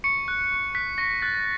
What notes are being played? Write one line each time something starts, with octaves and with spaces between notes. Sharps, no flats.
C#6 C#7
F#6
C#6
F#6 B6
C#6 A#6
F#6 A6